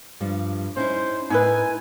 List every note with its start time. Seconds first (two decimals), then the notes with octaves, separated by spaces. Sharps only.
0.20 G2 F3 G3
0.77 C#4 D#4 E4 C5
1.30 A2 D#4 E4 B4 G#5